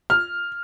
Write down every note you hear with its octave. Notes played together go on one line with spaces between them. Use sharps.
F6